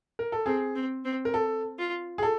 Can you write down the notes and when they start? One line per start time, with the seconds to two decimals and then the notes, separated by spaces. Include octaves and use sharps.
0.19 A#4
0.32 A4
0.46 C4 G#4
0.75 C4
1.05 C4
1.25 A#4
1.34 A4
1.78 F4
2.18 G#4
2.23 A4